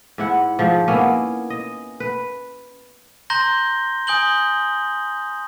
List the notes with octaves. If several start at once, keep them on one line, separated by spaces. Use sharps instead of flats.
G#2 E4 F#5
G#2 F3
A#3 B3 C#4 E4
D#5
B4
A#5 C6 G6 A#6 G7
G#5 D#6 G6 F#7 G7